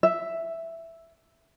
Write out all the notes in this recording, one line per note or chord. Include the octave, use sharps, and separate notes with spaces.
E5